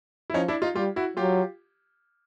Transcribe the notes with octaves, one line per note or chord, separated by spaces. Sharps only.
E4
F3 C#4 D#4
D4 E4
D#4 F4
G3 F4 G4
E4 F#4
F#3 F4 G4